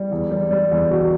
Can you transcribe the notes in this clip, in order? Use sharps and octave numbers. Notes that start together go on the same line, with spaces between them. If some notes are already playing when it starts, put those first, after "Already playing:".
Already playing: G3
E2
G3
G3
E2
B2